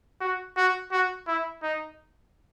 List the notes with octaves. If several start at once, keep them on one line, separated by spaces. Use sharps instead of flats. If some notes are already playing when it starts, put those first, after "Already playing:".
F#4
F#4
F#4
E4
D#4